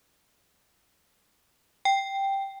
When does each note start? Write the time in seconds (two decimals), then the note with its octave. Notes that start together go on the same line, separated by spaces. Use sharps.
1.85 G5